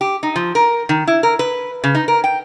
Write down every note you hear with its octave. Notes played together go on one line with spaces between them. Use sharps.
G4
D#4
F3
A#4
D#3
E4
A#4
B4
C#3
D#4
A#4
G5